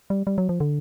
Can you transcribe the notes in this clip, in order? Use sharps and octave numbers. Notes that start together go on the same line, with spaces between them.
G3
G3
F#3
F3
D3